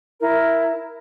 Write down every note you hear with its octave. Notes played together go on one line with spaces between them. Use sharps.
E4 A#4